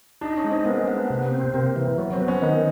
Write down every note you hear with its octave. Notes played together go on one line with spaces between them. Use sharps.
D4 D#4
C#4
G#3
C4
A#3 B3
B3
C3
C4
C3 A#3
E3
F#3 B3
C4
B3
C#4
D#3 D#4